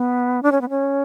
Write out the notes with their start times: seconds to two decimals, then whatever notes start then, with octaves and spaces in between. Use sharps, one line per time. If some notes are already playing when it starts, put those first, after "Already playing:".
Already playing: B3
0.43 D4
0.52 C#4
0.61 B3
0.69 C#4